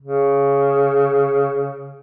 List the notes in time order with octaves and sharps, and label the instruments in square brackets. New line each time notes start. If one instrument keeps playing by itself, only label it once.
[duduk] C#3